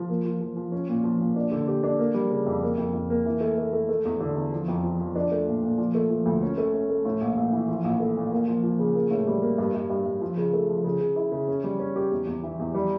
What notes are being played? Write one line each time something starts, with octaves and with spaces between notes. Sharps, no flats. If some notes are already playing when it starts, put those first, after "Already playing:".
Already playing: F3
A#3
F3
F3
F3
C#4
A#2
F3
A#2
D4
D3
G4
D4
A#3
G3
C#3
F2
A#3
F2
F2
A#3
E3
A3
A3
A3
A3
E2
D3
E2
F3
F2
F3
F3
D4
A3
A#2
A#2
F3
A3
F3
D2
C#4
A3
C#4
A3
A2
A#1
A#1
E3
F3
A#1
A3
A#2
A#3
F3
F3
C#3
A#3
A2
G3
A#3
G2
G2
G2
G2
F3
C#3
A3
F3
C#3
C#3
E4
C#3
C#4
G3
C#4
G4
E2
E2
E3
E2
G3